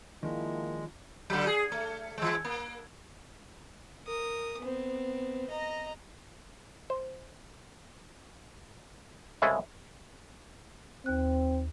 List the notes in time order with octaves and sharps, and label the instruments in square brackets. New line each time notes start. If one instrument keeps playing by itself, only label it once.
[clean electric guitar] D#3 F3 G4 [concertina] G#3 [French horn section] A#3 E4 [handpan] D4 F4
[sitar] D3 F#3
G#4
A3
E3 G#3
A#3
[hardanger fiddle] A#4 D#6
B3 C4
D#5 A#5
[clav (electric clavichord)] C5
C2 C#3 G#3 E4 G#4 A4
[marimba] D#2 F#6 [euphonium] C4